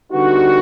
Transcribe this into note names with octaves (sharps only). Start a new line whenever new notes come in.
D3 G3 B3 D#4 F#4